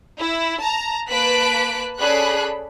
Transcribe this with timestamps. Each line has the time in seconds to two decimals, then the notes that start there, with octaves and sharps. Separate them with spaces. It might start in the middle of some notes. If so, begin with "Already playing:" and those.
0.19 E4
0.60 A5 A#5
1.09 A#3 B4 A5 F#6 B6 D7
1.97 C#4 G#4 A4 D5 B5 F#6